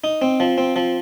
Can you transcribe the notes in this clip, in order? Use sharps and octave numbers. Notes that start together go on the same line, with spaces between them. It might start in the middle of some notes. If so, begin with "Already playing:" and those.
D#4
C4
F3
C4
F3